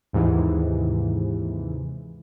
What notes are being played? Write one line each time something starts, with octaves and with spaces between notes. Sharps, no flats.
D#2 G#2 C3 E3